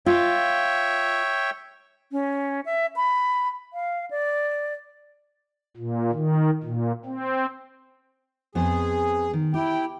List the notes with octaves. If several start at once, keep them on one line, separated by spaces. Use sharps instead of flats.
F4 C#5 E5 G5
C#4
E5
B5
F5
D5
A#2
D#3
A#2
C4
F2 B3 G#4 C5
D#3
E4 G4 G5